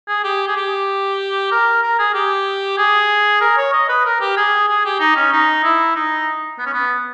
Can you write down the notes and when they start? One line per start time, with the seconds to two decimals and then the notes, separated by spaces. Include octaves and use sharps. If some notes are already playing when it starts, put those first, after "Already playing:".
0.08 G#4
0.24 G4
0.47 G#4
0.56 G4
1.51 A#4
1.83 A#4
1.99 G#4
2.14 G4
2.78 G#4
3.41 A#4
3.57 C#5
3.73 D#5
3.89 B4
4.05 A#4
4.21 G4
4.37 G#4
4.68 G#4
4.85 G4
5.00 D#4
5.16 C#4
5.32 D#4
5.63 E4
5.95 D#4
6.59 B3
6.66 C#4
6.73 B3